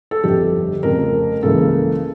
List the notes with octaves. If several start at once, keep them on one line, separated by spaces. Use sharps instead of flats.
A4
G1 F2 D3 G4
F1 F2 C#3 A#4
C#2 C#3 E3 A#3 A4